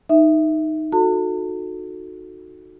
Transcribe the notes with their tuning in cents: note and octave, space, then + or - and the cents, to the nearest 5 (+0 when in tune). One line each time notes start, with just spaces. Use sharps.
D#4 +0 E5 +0
F#4 -15 A4 +0 A5 +45